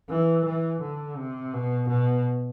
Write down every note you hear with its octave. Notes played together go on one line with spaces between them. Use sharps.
E3
E3
D3
C3
B2
B2